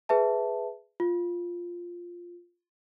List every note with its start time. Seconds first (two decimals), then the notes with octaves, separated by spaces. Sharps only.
0.09 G#4 B4 E5 A5
1.00 F4